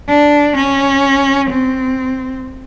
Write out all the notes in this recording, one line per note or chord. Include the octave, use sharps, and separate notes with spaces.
D4
C#4
C4